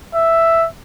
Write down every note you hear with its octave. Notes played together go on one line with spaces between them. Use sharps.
E5